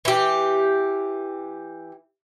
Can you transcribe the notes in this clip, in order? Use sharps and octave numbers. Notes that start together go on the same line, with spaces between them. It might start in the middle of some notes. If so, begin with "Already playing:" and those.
E3 G4